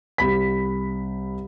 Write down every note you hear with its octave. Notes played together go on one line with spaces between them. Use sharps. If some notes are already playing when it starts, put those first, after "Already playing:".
C2 B5 B6